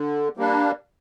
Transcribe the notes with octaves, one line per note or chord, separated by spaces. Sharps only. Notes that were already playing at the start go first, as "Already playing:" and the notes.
Already playing: D3
G3 A#3 D4